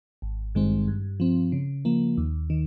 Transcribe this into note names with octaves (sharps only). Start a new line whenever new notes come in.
G#1
G2 D#3 G#3 C4
G2
F3 C4
C#3
F3 A#3
D#2
D#3